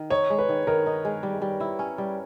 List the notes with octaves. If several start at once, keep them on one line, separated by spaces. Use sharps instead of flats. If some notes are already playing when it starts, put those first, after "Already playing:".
Already playing: D#3
D#4 C#5
G#3
B4
D#3
D#3 A#4
D#4
G#3
G3
G3
E4
C#4
G3